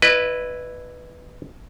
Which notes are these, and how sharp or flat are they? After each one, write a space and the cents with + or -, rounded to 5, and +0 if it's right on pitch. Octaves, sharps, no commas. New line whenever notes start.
E4 +0 B4 +0 D#5 -40